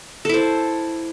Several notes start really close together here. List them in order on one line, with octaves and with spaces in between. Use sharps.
A4 E4 C5